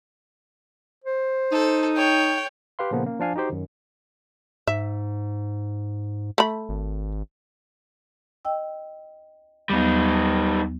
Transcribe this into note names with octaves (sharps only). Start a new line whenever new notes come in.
C5
D#4 A4
C#5 G5
G4 B4 F5 C6
A#2 C#3 F3 A#3 B3
A#3 C#4
F3 D4 F5 G#5
D#4 F#4 G4 C5
F#2 D#3
G#2 E5
A3 B5
G#1
D#5 G5 E6
D#2 F#3 G3 B3 D#4